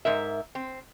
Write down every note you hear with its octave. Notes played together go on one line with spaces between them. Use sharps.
G#2 A#4 E5
C4